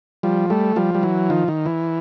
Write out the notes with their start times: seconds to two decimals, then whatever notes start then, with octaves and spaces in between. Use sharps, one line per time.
0.23 F3 G3
0.50 G3 A3
0.76 F3 G3
0.95 G3
1.03 E3 F#3
1.30 D#3 F3
1.48 D#3
1.66 E3